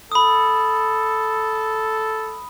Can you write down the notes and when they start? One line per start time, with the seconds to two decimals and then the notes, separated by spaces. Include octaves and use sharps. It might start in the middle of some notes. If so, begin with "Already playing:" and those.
0.12 A4 B5 D#6